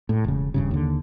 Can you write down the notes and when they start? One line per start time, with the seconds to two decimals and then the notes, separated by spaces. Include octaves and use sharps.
0.09 A2
0.24 E1 C#3
0.54 D#1 G2 C#3
0.71 D#2 D3